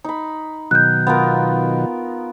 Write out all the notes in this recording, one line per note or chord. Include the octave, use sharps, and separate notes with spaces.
D#4 B5
B2 D#3 F#3 F#6 G6
B3 F4 A#4